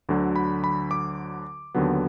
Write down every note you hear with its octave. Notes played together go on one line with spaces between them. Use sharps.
D2 D3 F#3
B5
B5
D6
D#2 D3 F#3 B3